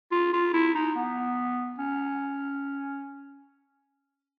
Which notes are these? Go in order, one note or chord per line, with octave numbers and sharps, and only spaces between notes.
F4
F4
E4
D#4
B3
C#4